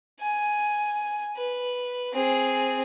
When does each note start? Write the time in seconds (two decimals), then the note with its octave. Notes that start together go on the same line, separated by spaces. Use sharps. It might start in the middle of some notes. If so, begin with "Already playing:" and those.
0.20 G#5
1.36 B4
2.13 C4 G#4